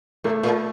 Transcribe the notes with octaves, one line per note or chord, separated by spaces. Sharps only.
A2 A3
A#2